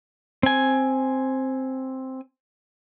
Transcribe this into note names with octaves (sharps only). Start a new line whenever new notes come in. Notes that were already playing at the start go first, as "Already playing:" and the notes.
C4 G#5